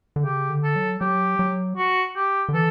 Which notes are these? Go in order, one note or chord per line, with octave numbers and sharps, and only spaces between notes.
D3
C#3 G4
D3
A4
F#3
F#3 G4
F#3
F#4
G4
D3
E3 A4